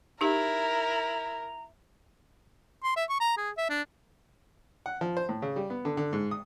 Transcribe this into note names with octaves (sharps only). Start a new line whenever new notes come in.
D#4 E4 G4 A#4 A#5
C6
E5
C#6
A#5
G#4
E5
D4
F#5
F3
C5
A2
C#3
G3
B3
D3
D3
G#2
D#6